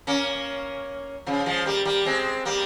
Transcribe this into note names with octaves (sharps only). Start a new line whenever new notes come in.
A#3 C#4
C#3 F3
F3 G#3
G3 A#3
G3 A#3
G#3 C4
G3 A#3